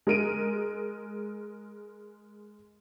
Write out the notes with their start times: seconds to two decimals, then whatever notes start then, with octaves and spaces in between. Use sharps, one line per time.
0.07 G#3 A#4 D7 D#7